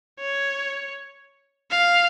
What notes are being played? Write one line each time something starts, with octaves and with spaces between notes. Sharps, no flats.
C#5
F5